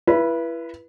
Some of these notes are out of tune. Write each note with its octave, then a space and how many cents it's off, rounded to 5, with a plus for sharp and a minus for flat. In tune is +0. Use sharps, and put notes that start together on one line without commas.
E4 +30 B4 -20